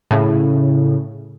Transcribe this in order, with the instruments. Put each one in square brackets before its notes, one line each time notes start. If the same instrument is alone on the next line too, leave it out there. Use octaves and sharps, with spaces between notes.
[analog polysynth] A2 C#3